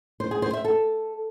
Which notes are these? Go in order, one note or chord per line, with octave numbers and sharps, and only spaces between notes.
C5
G#4
C5
E5
A4